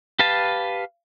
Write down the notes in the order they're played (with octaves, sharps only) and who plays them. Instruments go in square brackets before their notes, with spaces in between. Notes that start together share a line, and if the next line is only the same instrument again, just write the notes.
[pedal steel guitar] G4 B4 F5 A5